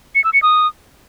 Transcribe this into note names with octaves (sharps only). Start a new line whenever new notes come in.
C#7
E6
C#7
D#6